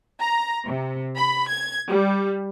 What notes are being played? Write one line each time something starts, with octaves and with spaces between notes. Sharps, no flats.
A#5
C3
B5
G#6
G3